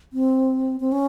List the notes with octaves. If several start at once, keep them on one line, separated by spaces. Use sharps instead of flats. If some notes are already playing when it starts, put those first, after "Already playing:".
C4
C4
C#4